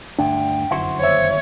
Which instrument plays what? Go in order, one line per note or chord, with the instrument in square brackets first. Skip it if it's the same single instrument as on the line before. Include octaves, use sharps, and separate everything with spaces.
[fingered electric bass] D#1 G2 D4 [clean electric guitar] D2 [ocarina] G5
[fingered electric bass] F1 F#2 D3 [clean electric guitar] E4 F#4 C5
[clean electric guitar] D#2 E5 [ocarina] C5 [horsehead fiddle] C#5